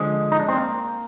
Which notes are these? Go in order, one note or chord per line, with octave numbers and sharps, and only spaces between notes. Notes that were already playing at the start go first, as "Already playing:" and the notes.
Already playing: D3 F3 G#3
D#4
D4
C4
A#3